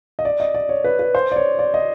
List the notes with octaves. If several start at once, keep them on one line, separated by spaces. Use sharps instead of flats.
D#5
D5
D#5
D5
C#5
B4
B4
C5
D5
C#5
D5
D#5